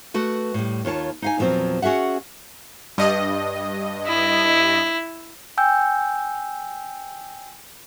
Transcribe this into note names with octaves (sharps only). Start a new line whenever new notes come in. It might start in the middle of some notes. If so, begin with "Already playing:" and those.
A3 F#4 B4
A2 G3
D#2 F4 C#5 A5
D#4 F5 G#5
E2 A#2 F3 F#3 C4
C#4 F#4 G#4 E5 F#5
G2 D#5
E4
G5 G#5 E6 G6